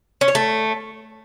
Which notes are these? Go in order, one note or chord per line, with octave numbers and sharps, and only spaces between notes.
C#4
C#5
A3